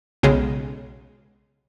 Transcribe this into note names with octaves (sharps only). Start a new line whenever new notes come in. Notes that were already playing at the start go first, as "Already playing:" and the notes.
B1 C#3 G#3